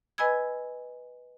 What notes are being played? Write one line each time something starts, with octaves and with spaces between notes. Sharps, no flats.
B4 D#5 G#5 B5 E6 G#6